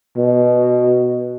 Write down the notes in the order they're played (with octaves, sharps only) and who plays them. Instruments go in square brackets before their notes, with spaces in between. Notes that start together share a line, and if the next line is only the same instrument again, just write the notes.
[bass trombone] B2